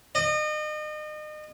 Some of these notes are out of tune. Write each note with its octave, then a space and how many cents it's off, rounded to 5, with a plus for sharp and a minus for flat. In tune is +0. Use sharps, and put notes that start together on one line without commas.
D#5 -35